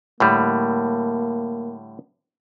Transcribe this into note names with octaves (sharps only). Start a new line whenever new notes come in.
A2 D3 G3 A#3